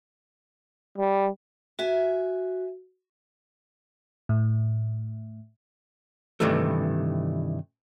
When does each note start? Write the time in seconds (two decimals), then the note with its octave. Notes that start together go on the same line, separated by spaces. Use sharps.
0.98 G3
1.79 F#4 E5 G#5
4.29 A2
6.40 G2 C3 D#3 E3 G3 A3